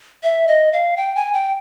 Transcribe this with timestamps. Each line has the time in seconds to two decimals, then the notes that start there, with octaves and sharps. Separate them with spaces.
0.23 E5
0.48 D#5
0.73 F5
0.97 G5
1.16 G#5
1.33 G5